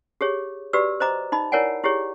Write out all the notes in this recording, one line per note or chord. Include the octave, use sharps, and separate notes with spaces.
G4 G#4 C#5
F#4 G4 B4 D5 E6
C5 D#5 A#5 D6
D#4 D#5 B5
E4 A#4 C#5 D5 F#5 G#5
E4 G4 G#4 C#5